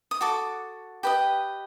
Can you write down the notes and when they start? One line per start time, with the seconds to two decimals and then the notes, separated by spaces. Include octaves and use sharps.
0.11 D#6
0.21 F#4 A4 D6
1.03 G4 B4 D#5